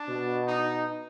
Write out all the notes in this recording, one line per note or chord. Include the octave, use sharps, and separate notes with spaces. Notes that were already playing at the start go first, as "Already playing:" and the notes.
Already playing: D4
B2
D#4